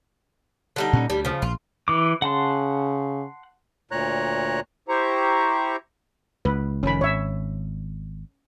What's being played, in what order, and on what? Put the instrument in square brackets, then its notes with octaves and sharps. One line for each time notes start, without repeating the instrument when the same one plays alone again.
[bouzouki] D3 G3 D#4
[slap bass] A#2 C#4
[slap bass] D2 [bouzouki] G3
[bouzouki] C#3 F3
[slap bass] A#1 [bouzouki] F4
[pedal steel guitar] E3 D6
[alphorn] C#3 [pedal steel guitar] F#5 A5 C6
[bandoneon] D2 A#2 C#5 A#5 F#6
[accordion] E4 G4 C5 A#5 C#6
[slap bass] C#2 [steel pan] B4
[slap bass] F1 F2 D#3 [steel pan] C#4 B5
[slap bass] G#1 [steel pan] C#5 E5